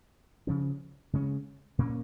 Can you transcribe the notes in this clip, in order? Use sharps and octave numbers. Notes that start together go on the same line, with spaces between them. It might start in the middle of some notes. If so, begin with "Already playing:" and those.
C#3 F3 C#4
C#3 G#3 C#4
A#2 A#3 C#4